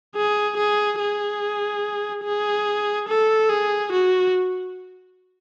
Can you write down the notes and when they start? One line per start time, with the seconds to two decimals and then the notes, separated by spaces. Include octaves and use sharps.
0.16 G#4
0.57 G#4
1.00 G#4
2.24 G#4
3.09 A4
3.49 G#4
3.92 F#4